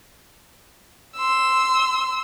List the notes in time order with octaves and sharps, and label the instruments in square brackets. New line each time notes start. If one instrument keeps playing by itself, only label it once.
[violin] C6 E6